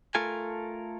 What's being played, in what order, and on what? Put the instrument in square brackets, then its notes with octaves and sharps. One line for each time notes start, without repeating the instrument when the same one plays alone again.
[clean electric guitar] A3 F4 A4 A#4 G#5